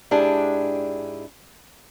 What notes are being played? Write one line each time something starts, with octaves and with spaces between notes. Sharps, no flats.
G#2 D4 E4 G4 G#4 A5